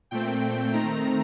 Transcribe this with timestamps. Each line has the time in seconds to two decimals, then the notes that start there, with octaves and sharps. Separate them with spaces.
0.11 A#2 A3 C4 G5
0.73 D#3 A3 C4 A#5